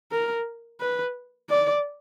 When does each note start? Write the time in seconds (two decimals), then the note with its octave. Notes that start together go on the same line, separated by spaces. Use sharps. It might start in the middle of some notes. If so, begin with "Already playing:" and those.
0.12 A#4
0.81 B4
1.50 D5